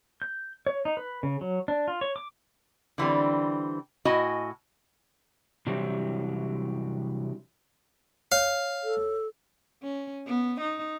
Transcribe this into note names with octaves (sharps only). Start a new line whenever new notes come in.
G6
C#5
D#4
B4
C#3
F#3
D4
F4
C#5
D6
D3 E3 G3 C4
A2 E4 F#4 D#5 G#5
C3 E3 F#3 G3 D4 E4
C#5 F5
A4
C#4
B3
D#4